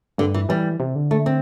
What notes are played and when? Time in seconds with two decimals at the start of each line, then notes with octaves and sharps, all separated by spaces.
0.18 G2 D3
0.34 E3
0.49 E3 G3
0.80 C3
0.95 D3
1.11 A3
1.26 C4